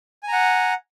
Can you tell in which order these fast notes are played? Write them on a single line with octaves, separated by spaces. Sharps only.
G#5 A#5 F#5